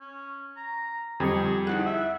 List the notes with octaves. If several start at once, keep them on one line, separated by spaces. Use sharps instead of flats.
C#4
A#5
F2 D3 G3 G#4 C#7
D#4 E4 G#4 F#5
E5